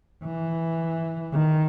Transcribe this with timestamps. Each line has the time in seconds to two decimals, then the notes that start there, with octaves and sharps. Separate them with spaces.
0.24 E3
1.33 D#3